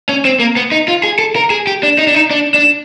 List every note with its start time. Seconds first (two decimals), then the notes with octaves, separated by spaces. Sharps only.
0.09 C#4
0.25 C4
0.40 A#3
0.57 B3
0.72 D#4
0.88 F4
1.04 G#4
1.19 A4
1.36 A#4
1.50 G#4
1.67 G4
1.83 D4
1.98 D#4
2.07 D4
2.15 D#4
2.31 D4
2.54 D4